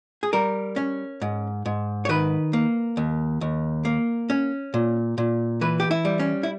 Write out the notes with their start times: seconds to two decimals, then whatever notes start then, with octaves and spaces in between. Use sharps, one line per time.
0.23 G#4
0.33 G3 A#4
0.76 C#4
1.22 G#2
1.66 G#2
2.05 C#5
2.09 D#3 B4
2.53 A#3
2.97 D#2
3.41 D#2
3.85 A#3
4.30 C#4
4.74 A#2
5.18 A#2
5.61 E3 B4
5.80 G4
5.91 E4
6.05 G3
6.19 C#4
6.43 E4